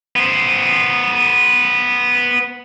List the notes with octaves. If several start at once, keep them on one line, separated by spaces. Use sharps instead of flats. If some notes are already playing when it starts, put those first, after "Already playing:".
B3 C5